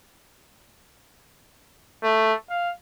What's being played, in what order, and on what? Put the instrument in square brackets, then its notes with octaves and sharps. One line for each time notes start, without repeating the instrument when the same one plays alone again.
[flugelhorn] A3
F5